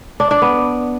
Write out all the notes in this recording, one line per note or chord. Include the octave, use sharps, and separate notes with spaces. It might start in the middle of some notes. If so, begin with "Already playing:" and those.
D4
D4
B3